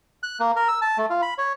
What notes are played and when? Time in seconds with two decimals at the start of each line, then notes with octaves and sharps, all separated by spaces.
0.23 F#6
0.40 A#3
0.56 A#4
0.68 E6
0.82 A5
0.98 A3
1.10 F4
1.22 B5
1.38 C#5